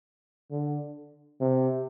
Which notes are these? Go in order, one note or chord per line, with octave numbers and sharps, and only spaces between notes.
D3
C3